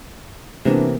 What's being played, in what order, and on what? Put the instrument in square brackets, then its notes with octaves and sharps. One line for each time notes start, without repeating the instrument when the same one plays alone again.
[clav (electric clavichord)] C3 [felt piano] E3 A#3 B3 [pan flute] D4